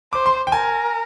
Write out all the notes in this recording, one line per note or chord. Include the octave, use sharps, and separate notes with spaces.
C5 D6
C6
G5
A#4 G#5